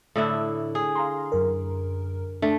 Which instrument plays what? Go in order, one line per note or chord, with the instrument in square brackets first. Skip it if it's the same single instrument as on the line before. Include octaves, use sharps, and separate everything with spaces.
[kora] A2 D3 E4
G#4
[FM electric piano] F5 A#5 C6
F#2 A#4
[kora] A3 [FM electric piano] D4